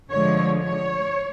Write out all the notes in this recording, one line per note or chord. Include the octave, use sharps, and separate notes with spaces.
D3 F3 G#3 C#5
C#5